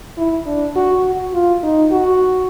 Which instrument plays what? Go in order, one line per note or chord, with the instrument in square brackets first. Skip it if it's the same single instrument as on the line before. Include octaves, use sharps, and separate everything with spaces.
[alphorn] E4
D4
F#4
F#4
F4
D#4
F#4